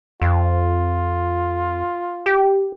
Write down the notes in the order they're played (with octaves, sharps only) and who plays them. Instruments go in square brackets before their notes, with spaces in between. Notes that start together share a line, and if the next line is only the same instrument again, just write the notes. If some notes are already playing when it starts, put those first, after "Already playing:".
[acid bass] F2 [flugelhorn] F4
[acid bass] G4